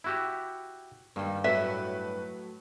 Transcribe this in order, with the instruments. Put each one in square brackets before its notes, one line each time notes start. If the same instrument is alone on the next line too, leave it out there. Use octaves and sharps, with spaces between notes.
[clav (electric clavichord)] E4 F#4 G4
[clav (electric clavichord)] G2 [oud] D#3 A#3
[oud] A2 F#3 [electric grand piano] B4 [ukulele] E5